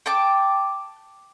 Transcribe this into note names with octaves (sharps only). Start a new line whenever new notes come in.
G5 A5 D6